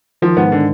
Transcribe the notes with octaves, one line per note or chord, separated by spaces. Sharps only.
D#3 F3
G#2 B3
D3